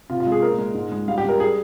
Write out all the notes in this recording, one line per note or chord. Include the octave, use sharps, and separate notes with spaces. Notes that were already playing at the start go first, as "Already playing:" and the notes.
C3 F4
F4
G#3
G#4
A#2 A#4
G#3
G#2
G#3
G3 F5
G4
G3 A#4
G#4